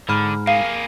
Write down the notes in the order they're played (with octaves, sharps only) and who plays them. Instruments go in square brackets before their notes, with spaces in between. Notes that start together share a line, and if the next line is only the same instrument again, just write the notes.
[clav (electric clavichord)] G#2 [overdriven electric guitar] D3 [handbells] B5 F6
[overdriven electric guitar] A#3 G#4 [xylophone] F5